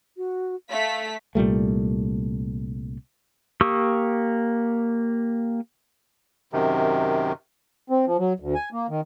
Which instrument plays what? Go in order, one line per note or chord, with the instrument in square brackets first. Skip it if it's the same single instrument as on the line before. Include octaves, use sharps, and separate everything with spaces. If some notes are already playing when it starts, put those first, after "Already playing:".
[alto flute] F#4
[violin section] A3 B6 [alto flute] F5
[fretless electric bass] C2 A#2 G3 A3
[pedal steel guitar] A#3 G4 C#6 D#6 E6
[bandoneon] F#2 C3 D#3
[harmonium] C4
F3
F#3
D2
G#5
A#3
D#3